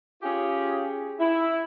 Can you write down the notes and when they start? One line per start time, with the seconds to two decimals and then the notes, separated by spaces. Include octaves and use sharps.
0.23 C#4 F4 G4 G#4
1.20 E4